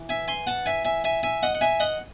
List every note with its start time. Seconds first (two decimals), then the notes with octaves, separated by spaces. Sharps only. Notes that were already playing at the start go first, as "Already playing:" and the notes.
Already playing: E3
0.09 E5 G#5
0.28 G#5 C6
0.47 F#5 A5
0.66 E5 G#5
0.85 E5 G#5
1.04 E5 G#5
1.23 E5 G#5
1.43 D#5 F#5
1.55 F#5
1.61 E5 G#5
1.80 D#5 F#5